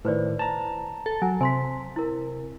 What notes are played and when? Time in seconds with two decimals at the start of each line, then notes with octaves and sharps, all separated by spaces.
0.05 A2 D#3 B4 C5 D5
0.39 A5 A#5
1.06 A4
1.22 F#3 G#5
1.41 C3 G#5 C6 B6
1.96 E4 A#4